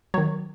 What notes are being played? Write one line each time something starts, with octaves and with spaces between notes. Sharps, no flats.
D#3 F#3 C#5